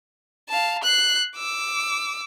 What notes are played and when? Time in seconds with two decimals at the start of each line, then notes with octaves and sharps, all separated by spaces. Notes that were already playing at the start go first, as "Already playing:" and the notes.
0.49 F5 A5
0.83 F#6 C7
1.36 D6 E6